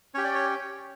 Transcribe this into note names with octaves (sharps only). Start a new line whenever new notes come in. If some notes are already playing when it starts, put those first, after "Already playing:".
C#4 G4 C#5
D5
C#5